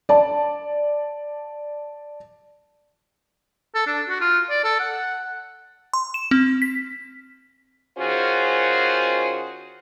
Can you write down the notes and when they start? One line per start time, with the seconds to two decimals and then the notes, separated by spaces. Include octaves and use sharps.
0.09 D5 A5
3.74 A4
3.87 D4
4.09 F#4
4.21 F4
4.50 D5
4.64 A4
4.80 F#5
5.94 C6
6.14 E7
6.31 C4
6.62 B6
7.98 D#3 C#4 F4 F#4 G#4 C5